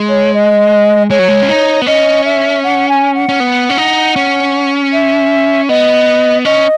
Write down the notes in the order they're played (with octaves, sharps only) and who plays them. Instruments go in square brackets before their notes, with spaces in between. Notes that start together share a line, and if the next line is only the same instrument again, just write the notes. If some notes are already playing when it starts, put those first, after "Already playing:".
Already playing: [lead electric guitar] G#3
[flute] C#5
D#5
[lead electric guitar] G#3 [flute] C#5
[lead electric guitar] F#3
G#3
C#4
D#4
B3
[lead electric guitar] C#4 [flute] D#5
[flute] E5
F#5
G#5
F#5
[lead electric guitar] C#4
B3
C#4
D#4
C#4
[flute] E5
[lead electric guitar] B3 [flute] D#5
[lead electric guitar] C#4 [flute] D#5